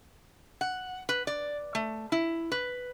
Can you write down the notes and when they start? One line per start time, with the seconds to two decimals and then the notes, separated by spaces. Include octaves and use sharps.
0.61 F#5
1.09 B4
1.27 D5
1.75 A3
2.12 E4
2.52 B4